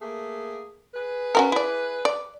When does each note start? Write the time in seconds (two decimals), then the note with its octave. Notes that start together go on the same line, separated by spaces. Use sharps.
0.02 A3 A#3 G#4
0.94 G#4 B4
1.35 C#4 F#4 A#4
1.52 E4 D5
2.05 D5